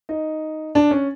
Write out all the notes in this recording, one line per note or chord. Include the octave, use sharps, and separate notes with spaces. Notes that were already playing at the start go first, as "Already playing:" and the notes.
D#4
D4
C#4